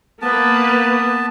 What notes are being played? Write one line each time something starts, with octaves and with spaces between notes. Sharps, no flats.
A#3 B3 B4 A5